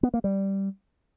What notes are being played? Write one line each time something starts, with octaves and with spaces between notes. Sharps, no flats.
B3
A#3
G3